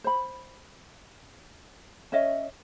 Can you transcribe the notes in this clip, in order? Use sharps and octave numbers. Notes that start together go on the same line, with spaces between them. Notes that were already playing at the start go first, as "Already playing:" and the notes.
C5 B5
C#4 C#5 D#5 E5